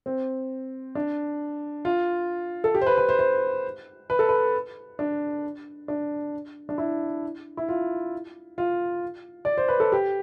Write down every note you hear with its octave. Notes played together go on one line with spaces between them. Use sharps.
C4
D4
F4
A4
G4
C5
B4
B4
C5
C5
B4
A4
B4
D4
D4
D4
E4
E4
F4
F4
D5
C5
B4
A4
G4